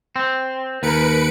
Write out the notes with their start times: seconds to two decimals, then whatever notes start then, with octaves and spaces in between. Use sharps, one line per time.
0.16 C4
0.83 D#2 A#4 B4 C#7 D7